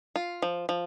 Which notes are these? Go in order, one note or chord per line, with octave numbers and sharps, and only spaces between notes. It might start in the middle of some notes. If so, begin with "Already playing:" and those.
F4
F3
F3